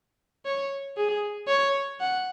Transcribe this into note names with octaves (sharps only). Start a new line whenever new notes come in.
C#5
G#4
C#5
F#5